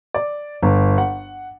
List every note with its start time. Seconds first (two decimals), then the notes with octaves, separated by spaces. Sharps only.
0.14 D5
0.62 G1
0.98 F#5